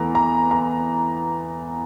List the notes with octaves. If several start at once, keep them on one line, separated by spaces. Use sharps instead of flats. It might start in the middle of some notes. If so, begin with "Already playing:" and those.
Already playing: E2 E3 A3 A#5
A#5
A#5